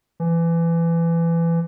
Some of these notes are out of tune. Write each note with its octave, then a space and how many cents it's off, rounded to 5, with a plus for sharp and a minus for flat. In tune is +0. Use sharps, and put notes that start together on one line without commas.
E3 +25